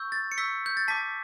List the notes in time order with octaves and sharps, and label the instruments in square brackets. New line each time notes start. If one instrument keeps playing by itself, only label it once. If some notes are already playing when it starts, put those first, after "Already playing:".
Already playing: [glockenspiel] C#6 E6 G6
A6
C#7
C#6 E6 G6 B6
G6
A6
A5 D6 G6 B6